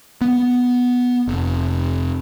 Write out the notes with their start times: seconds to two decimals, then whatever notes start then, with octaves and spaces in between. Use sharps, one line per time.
0.21 B3
1.27 F1